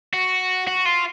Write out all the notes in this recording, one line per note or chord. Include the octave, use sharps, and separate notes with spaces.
F#4
F#4
F4